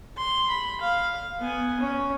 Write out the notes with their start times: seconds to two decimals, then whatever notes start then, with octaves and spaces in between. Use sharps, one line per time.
0.17 C6
0.49 B5
0.81 F5
1.40 B3 G#5
1.80 C#4